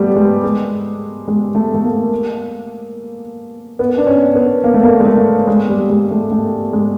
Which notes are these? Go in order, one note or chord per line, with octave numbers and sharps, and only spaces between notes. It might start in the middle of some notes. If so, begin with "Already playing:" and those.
Already playing: G3 A3 B3
G#3
G#3
G#3
A3
A3
A#3
B3
D4
C#4
B3
A#3
A3
A#3
G#3
A3
G#3
G3
G#3
A3
A3
G#3